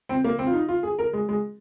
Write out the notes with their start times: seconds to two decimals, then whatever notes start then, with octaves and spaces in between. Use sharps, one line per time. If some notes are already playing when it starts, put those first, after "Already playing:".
0.09 C4
0.24 A#3
0.39 C4
0.47 F4
0.54 D#4
0.68 F4
0.83 G#4
0.99 A#4
1.13 G#3
1.29 G#3